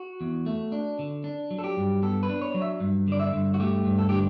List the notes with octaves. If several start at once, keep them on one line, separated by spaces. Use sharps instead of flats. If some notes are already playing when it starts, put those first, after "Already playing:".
Already playing: F#4
E2
A3
D4
D3
D4
F#3
A4
G4
G2
B3 A4
B4
D4
C#5
F#3
E5
G2
D3 D5
E5
G2
F#4
A3 G4
G2
A4
D3 G4